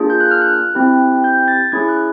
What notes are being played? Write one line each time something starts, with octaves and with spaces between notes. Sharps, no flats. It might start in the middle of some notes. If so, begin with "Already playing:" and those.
Already playing: A#3 D4 F4 G#4
G6
F#6
F6
F#6
C4 E4 G4
G6
A6
C#4 E4 G#4 G#6
F#6